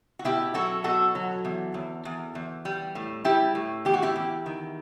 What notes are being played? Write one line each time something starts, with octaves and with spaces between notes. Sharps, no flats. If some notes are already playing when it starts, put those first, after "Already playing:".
F#4
B2 E4 G4
F#3 F#4 A4
B2 F#4 A4
F#3
E2
E2
E2
E2
G3
A2
G3 E4 G4
A2
E2 G4
F#4
E4 G4
E2
D#3